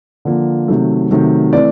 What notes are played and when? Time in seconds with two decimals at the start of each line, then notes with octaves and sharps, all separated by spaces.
0.25 D3 F3 A#3
0.68 C3 D#3 F#3 A3
1.11 C3 D#3 F#3 A3
1.53 E3 A3 C4 D5